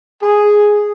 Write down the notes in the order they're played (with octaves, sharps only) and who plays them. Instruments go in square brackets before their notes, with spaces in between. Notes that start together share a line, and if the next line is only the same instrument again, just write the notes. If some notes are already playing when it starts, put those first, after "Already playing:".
[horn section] G#4